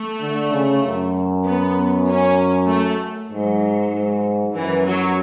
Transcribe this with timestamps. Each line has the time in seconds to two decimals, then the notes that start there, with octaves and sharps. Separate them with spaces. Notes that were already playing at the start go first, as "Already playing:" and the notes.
Already playing: A3
0.22 D3
0.53 C#3
0.84 F#2
1.45 B3
2.07 C#4
2.69 A3
3.31 G#2 F#3
3.92 G#2
4.54 F#2 E3
4.85 F#3